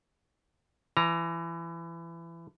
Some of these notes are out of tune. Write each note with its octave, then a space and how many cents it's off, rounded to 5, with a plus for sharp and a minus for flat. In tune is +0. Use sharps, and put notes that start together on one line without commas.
E3 +25 A#5 +0